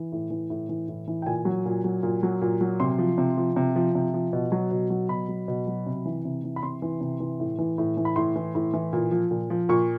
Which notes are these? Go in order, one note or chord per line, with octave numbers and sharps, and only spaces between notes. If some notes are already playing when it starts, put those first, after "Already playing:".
Already playing: E3
A2
E3
A2
E3
A2
E3
G5
A#2 G#5
F#3
A#2
F#3
A#2
F#3
A#2
F#3
C3 C6
F3
C3
F3
C3
F3
C3
F3
B2
F#3
B2
F#3
B2 B5
F#3
B2
F#3
C3
E3
C3
E3
B5
C3 C6
E3
C3
E3
A2
E3
A2
E3
B5
A2 C6
E3
A2
E3
A#2
F3
A#2
F3
A#2 C#6